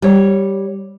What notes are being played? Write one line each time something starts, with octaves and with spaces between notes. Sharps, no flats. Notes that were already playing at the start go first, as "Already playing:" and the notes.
G3 C#5